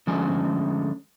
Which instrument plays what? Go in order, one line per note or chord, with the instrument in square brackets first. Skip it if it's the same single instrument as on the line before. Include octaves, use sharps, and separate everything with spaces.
[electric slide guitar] D3 F3 G#3 A3 C#4 G#5